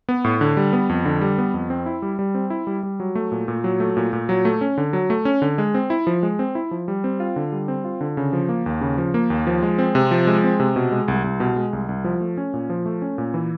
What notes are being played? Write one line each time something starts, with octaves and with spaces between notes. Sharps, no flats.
B3
A2
D3
G3
B3
F2
D3
G3
B3
F2
C4
E4
G3
G3
C4
E4
G3
G3
F#3
A3
A#2
A#2
F#3
A3
A#2
A#2
F#3
A3
C#4
D3
F#3
A3
C#4
D3
G#3
C4
E4
F3
G#3
C4
E4
F3
G3
C4
F4
D3
G3
C4
F4
D3
C#3
F3
A#3
D#2
C#3
F3
A#3
D#2
F3
G#3
C4
C3
F3
G#3
C4
C3
B2
G#3
C2
C2
B2
G#3
C2
C2
F3
A3
C#4
A#2
F3
A3
C#4
A#2
E3